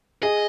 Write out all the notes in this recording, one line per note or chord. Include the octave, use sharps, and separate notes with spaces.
G#4 D#5